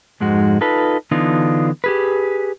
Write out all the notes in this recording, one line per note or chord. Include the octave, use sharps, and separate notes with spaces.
F2 G#2 G#3 D#4 F#4
D#4 F4 A4 B4
D3 E3 B3 D4 D#4 F4
G4 G#4 B4